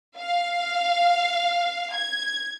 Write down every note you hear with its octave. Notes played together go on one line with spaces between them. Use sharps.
F5
G#6